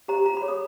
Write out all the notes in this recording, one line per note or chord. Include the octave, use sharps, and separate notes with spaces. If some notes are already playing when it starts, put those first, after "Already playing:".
G4 C5 A#5
F4 A#5
B5
G#4 C#5
D#6